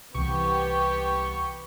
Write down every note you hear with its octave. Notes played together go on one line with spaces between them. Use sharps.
C2 C3 E3 B3 G4 C#6